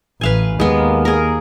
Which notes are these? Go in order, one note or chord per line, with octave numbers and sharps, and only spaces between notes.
A1 B4 F5 G#5
D#2 G#3 A#3 B3
G#4 A#4